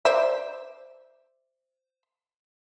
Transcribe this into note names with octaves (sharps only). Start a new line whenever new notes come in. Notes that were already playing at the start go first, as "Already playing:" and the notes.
C5 D5 E5